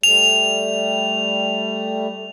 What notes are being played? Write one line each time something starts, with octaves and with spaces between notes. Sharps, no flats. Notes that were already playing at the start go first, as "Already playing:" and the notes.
G3 A3 F7